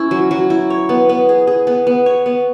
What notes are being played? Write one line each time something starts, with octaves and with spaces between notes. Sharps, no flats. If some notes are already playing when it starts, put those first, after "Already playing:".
Already playing: C#4 E4
F#3
F#3
E4
C#5
B3
B3
G#4
G#4
B3
B3
C#5
B3